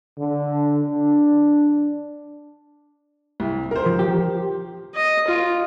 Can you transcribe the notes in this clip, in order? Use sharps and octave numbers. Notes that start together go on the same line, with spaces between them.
D3
D4
C2
A#4 C5
F3
G4
D#5
F4